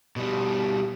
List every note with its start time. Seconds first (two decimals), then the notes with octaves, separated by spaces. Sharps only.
0.16 B2 G3